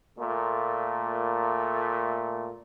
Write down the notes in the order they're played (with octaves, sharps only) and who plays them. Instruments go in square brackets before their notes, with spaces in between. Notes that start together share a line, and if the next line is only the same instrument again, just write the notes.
[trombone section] A#2 A3